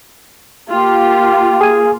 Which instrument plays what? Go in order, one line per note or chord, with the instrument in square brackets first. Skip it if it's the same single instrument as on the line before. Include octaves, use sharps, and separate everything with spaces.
[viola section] A#3 F4 [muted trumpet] G4
[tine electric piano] G#4 G#5